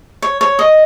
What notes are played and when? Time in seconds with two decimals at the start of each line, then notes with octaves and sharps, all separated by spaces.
0.22 C#5
0.41 C#5
0.59 D#5